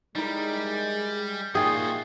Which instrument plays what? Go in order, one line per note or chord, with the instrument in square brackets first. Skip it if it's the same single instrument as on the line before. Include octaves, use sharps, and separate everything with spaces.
[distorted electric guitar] G3 [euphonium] G#3 [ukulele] D#4 E4 A#4
[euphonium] A#2 [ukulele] D#4 E5 G5 [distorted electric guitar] F4 F#4 [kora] G#4